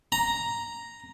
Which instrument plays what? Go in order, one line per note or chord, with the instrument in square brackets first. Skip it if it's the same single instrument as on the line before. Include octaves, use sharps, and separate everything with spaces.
[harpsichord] A#5